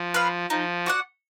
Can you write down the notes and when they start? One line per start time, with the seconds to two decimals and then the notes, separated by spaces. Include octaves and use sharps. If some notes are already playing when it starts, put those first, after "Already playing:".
Already playing: F3
0.14 B4 F5
0.50 F3 D#4
0.86 F#4 D5 F#5